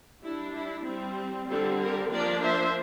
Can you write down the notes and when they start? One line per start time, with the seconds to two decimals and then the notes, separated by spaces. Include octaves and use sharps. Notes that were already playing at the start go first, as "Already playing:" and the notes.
0.23 G3 D4 E4
0.55 E4
0.87 G3 C4
1.49 D3 G3 C4 F4 A4
1.81 G4 A#4
2.12 F3 A#3 D4 A#4 D5
2.44 C5 E5